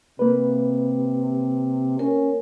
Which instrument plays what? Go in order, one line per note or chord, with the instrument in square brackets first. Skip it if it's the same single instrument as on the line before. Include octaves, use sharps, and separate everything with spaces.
[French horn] C3 [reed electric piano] A#3 B4
[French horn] C#4 [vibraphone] A#4